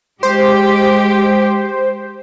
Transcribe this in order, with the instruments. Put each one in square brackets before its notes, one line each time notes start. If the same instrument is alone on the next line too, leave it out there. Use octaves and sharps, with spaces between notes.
[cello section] G#3 G4 [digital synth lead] C5